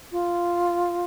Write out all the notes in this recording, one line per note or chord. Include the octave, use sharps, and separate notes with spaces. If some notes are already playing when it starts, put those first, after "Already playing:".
F4